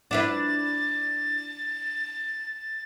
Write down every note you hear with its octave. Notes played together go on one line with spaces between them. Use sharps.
D4 E4 B4 A6